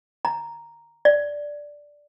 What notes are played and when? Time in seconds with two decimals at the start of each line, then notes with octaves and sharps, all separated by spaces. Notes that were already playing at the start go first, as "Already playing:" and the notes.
0.25 A#5
1.05 D5